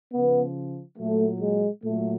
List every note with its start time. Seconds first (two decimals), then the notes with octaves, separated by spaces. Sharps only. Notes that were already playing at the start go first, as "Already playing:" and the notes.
0.13 C#3 F3 B3
0.98 A#2 F#3 A3
1.41 G#3
1.84 A#2 F#3 A3